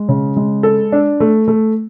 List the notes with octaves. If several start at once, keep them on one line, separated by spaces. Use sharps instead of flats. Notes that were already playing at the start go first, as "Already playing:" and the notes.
Already playing: G#3
C#3
G#3
A4
D4
A3
A3